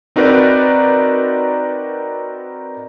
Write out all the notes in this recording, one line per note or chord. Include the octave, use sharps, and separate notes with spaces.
C4 D#4 F#4 A#4 B4 D5